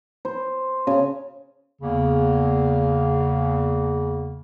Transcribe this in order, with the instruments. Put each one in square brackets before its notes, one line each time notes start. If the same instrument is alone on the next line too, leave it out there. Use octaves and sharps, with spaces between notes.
[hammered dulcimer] C5
C#3
[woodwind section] E2 C#3 A#3